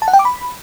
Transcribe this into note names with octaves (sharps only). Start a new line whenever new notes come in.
A5
F#5
G5
D6
B5